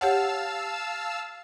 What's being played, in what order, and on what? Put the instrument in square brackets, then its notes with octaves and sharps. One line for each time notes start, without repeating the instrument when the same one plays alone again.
[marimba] G4 C#5 F#5 [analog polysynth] F5 A5 E6